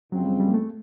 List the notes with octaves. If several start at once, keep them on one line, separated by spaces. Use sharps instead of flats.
F#2 C#3 F3 F#3 G#3 C4
G3
G3
A#3
A3